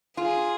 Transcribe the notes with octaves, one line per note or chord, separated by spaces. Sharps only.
F4 G#4